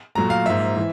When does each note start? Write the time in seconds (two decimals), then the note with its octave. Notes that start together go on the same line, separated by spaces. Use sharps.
0.15 A#2 F#3 A3 A#5
0.30 F5
0.46 G#2 F3 A#3 E5
0.77 E3